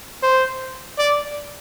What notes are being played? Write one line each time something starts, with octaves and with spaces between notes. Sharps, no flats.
C5
D5